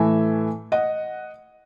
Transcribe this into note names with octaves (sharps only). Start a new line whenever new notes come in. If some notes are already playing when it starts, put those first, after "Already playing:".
Already playing: A2 E3 A3 E5 G#5
D#5 F#5